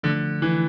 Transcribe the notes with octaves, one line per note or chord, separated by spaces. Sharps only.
D3 F3 A3 D4
E3